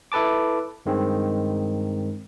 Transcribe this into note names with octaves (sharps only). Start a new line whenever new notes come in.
E4 A4 B4 A5 D6
G2 D#3 G#3 C4